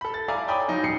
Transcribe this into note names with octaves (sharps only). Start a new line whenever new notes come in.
A4 B5
A6
D5 E5 F5 G#5 A#5 D6
C#5 G5 G#5 B5 D6 D#6
F3 F#3 D#4
D#1 C#4 C7 C#7